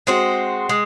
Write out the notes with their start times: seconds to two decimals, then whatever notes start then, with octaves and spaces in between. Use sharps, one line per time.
0.07 G#3 C4 F#4
0.69 G#3